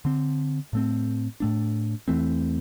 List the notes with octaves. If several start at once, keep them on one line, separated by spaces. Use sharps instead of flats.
D3 C4
A2 A3 C4
A2 A3 D4
E2 E3 A3 C4